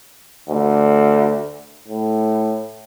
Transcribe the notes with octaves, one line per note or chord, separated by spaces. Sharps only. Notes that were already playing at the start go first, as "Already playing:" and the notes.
D2
A2